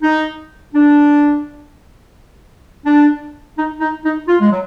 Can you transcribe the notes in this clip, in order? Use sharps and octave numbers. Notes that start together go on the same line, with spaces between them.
D#4
D4
D4
D#4
D#4
D#4
F4
G#3
F#3